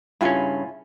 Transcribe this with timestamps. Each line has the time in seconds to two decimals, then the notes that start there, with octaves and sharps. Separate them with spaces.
0.21 G2 C#3 C#4 E4 F4 G#5